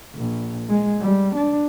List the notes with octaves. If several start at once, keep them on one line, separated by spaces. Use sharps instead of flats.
A#1
G#3
G3
D4